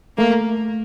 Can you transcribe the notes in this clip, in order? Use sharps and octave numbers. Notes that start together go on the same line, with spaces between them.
A3 A#3